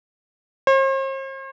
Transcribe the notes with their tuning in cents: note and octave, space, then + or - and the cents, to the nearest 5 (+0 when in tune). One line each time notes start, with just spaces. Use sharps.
C5 +45